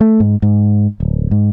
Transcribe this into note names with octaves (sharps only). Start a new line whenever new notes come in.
A3
G#2
G#2
D1
G#2